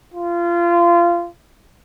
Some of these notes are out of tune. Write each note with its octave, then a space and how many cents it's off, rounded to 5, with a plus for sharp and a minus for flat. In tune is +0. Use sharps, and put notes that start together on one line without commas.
F4 -25